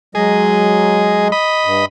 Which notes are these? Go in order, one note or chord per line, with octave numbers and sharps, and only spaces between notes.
F#3 G#3 G#4 D#5
D#5 B5
G2